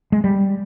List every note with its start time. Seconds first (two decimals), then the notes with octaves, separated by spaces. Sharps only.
0.12 G#3
0.24 G3